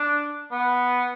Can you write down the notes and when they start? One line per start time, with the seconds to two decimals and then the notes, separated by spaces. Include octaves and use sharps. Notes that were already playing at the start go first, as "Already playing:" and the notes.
Already playing: D4
0.51 B3